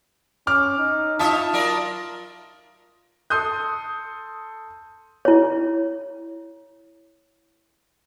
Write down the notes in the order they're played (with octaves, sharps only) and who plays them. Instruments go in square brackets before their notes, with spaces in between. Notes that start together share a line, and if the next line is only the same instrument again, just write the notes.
[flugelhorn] C#4 [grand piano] D6 F6
[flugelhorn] D#4
[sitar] D#4 C#5 E5 [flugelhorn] F4 [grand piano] A5 D#6
[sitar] F#3 A#4 D5
[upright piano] A4 C6 D#6 G6
[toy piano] E4 C#5